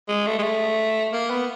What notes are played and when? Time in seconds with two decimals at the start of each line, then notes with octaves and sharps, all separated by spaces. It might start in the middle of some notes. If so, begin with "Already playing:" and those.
0.08 G#3
0.27 A3
0.39 G#3
0.43 A3
1.13 A#3
1.30 B3